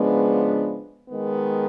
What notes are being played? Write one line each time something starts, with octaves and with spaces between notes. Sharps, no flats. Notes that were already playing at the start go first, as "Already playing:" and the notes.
Already playing: C#3 F3 G#3 B3 D4
D#3 G#3 B3